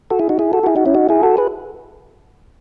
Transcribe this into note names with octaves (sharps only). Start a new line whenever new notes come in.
F#4 A4
E4 G#4
D#4 F#4
E4 G#4
F#4 A4
F#4
E4 G#4
D#4 F#4
C#4 E4
D#4 F#4
E4 G#4
F#4 A4
G#4 B4